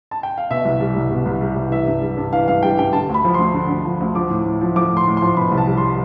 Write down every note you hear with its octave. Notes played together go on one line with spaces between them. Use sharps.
A5
G5
F5
B2 E5
C2
G3
C2
B2
C2
G3
C2
E3 E5
G2
G3
G2
E3 F5
G2 F5
G3 G5
G2 G5
D3 A5
D2
B5
F3
D2 C6
D3
D2
F3
D2
F3 D6
A2
A2
F3
F3 D6
A2 C6
A2
C6
F3
B2 B5
C2
A5
G3
C6